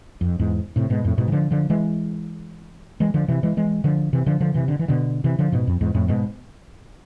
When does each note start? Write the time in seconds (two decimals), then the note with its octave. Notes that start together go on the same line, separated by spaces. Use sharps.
0.21 F2
0.39 E2 G#2
0.76 A2 C3
0.90 G#2 B2
1.04 F2 A2
1.18 G#2 B2
1.28 E3
1.32 D3 F3
1.51 D3 F3
1.70 E3 G#3
3.00 E3 G#3
3.14 D3 F3
3.28 C3 E3
3.43 E3 G#3
3.57 E3 G#3
3.84 D3 F3
4.13 C3 E3
4.26 D3 F3
4.40 D3 F3
4.54 C3 E3
4.68 D3
4.79 E3
4.88 B2 D3
5.24 C3 E3
5.39 D3 F3
5.52 G#2 B2
5.67 F2
5.81 E2 G#2
5.95 F2 A2
6.08 G#2 B2